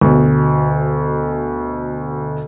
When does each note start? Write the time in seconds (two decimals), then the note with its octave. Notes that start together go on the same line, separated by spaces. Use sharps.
0.01 D2 B2